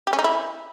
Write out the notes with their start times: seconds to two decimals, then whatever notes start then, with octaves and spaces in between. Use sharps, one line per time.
0.07 G4
0.13 C#4
0.19 D#4
0.24 E4